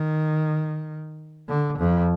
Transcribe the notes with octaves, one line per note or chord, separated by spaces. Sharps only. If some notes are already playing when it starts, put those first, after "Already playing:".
Already playing: D#3
D3
F2